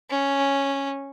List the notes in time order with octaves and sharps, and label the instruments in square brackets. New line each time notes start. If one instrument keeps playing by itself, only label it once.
[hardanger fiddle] C#4